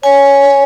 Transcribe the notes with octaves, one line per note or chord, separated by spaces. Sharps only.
C#5 G#5